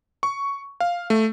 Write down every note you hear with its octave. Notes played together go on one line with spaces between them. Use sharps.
C#6
F5
A3